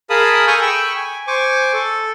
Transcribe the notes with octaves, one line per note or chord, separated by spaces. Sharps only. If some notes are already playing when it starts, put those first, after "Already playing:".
G#4 A#4 F5 A5 B5 D#6
A4 G#5 C#6 D#6 F6 G6
G5 B5 C#6 E6
G#5
C5 G#5 C#6 D6
A4